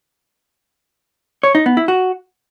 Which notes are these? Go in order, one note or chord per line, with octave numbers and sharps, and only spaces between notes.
C#5
D#4
B3
E4
F#4